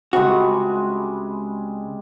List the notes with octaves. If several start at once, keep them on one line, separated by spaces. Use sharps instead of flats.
C#2 C3 G3 G#3 F#4